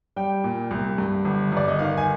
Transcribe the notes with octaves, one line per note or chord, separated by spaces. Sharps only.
G3 G5
A#2
C2
G2
G1
G1 D5
D#5
D#3 F5
G#5